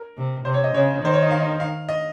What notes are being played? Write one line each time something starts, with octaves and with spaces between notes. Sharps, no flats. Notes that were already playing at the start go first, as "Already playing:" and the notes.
Already playing: A#4
C3
C3 C5
C#5
D#5
C#3 C#5
D#3 C5
C#5
D#5
F5
D#5
F5
D#5